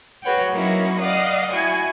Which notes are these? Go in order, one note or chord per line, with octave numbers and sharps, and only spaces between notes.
F#4 G#4 B4 C#5 F#5 G5
F#3 A#3 C#4 D#4 E4 F#4
D5 D#5 F5 F#5 D#6
E4 F#4 G5 G#5